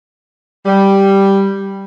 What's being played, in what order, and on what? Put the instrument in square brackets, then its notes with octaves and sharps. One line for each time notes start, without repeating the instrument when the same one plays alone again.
[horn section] G3